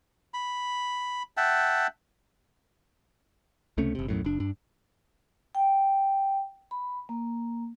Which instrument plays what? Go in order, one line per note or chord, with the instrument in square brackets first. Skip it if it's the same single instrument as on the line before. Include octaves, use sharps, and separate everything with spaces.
[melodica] B5
E5 F#5 G5 A5
[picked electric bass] C#2 C3 A3 C#4
F#1 C3
B1 F#2 A2
F#1 D4
G2 D4
[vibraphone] G5
B5
A#3